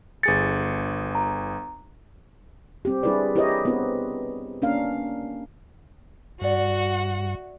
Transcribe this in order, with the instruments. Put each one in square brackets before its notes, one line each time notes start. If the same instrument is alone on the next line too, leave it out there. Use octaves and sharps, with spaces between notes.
[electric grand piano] G1 G#4 C#7 [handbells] A6
[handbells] A#5
[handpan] G3 C4 G4
G3 D4 E4 G#4 B4 D5
E4 G4 A#4 B4 C#5 D#5
B3 C4 D4 E4 G4 B4
A#3 C#4 D4 A#4 F5
[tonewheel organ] G2 [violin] F#4 F#5 [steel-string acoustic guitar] D5 E5